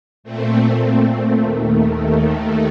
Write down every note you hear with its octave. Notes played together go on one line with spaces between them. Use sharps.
A#2 A3 C4
D#2 D#3 A3